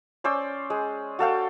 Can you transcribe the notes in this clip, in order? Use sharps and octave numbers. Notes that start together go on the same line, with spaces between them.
C#4 C5 D5 E6
G#3
F#4 A4 F5 G5